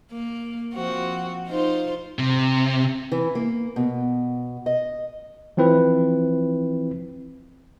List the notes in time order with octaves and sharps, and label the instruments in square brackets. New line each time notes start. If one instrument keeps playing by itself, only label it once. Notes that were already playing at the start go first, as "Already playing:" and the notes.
[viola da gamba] A#3
F3 C4 F#4
D#4 F4 C5
[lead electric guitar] C3
[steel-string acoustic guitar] E3
A#3
B2
D#5
[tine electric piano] E3 F3 C4 E4 B4